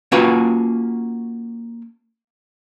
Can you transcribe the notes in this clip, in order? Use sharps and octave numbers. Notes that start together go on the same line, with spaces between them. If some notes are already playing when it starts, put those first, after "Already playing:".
A#3 C#4 F4 F#4 B4 G5